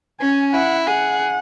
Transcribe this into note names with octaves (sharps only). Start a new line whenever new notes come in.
C#4 G#5
E4 F#5
G#4 F#5